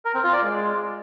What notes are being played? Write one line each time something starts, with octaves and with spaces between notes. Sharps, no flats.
A#4
C4
F4
D5
G#3